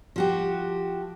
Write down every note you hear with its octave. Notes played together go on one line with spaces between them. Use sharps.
F3 F#4 G4